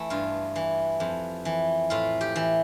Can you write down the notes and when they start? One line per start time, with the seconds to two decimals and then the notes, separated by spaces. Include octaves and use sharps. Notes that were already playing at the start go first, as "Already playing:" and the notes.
Already playing: E3 A3
0.10 G2 F4
0.56 E3
1.00 F2
1.45 E3
1.90 A2 F4
2.21 G4
2.36 E3